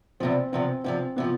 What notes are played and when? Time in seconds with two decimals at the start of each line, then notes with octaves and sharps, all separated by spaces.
0.20 E2 C3 F3 C4
0.52 E2 C3 F3 C4
0.84 E2 C3 F3 C4
1.16 C3 F3 B3